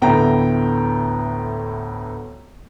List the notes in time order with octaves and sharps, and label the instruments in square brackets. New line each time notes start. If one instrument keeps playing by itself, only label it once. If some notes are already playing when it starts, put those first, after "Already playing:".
[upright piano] D2 A2 A3 B3 G5 A#5